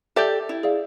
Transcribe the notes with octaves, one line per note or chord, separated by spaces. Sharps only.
G4 A4 D5 E5 G6
E4
G#4 D5 F5